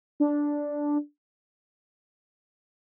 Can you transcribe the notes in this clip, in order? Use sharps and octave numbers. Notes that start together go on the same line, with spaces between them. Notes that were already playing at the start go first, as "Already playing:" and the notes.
D4